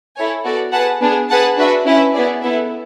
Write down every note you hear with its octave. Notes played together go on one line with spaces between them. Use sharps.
E4 A4 C#5 G#5
B3 F#4 A4 D5
G#4 B4 F#5 A5
B3 D4 G#4
G#4 B4 F#5 A5
D4 F#4 B4 E5
C#4 E4 B4 E5
B3 E4 G#4 D5
B3 E4 A4 E5